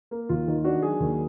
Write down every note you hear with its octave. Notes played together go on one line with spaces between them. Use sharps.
A#3
D#2 F4
D#3
D4 F#4
F#3 G#4
D#2